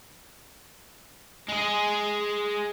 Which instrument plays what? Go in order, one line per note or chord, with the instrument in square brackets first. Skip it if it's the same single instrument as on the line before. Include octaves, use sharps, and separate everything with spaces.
[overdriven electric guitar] G#3 G#4